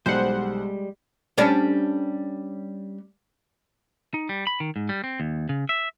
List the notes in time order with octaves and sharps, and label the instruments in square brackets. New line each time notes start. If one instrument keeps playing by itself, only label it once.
[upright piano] B1 [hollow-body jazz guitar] G3 G#3 [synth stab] C5 F#5
[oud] G3 C#4 D4
[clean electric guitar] D#4
G3
B5
D#3
G#2
G3
C4
D#2
C#3
E5